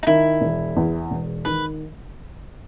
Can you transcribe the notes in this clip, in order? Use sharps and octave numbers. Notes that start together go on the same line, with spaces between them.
D#4
D#3 E4
E1
E2
E1
D#3 B4